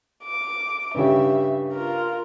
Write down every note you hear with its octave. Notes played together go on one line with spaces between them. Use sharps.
D6
G2 C#3 G4 E5
F4 A#4